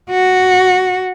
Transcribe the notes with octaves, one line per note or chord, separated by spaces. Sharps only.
F#4